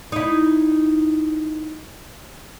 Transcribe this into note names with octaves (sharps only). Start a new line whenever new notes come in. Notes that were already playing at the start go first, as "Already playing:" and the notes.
D#4 E4